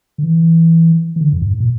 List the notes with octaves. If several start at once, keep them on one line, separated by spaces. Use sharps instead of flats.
D3
E3
E3
D3
F2
G2
A2
A#2